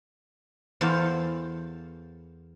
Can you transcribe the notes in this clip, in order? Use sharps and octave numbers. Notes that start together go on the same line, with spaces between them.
E2 A4 C5 F5